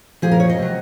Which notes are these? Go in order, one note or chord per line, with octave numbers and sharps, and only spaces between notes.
A#2 F3 G#4
A#4
C#5
D#5
C3 F#3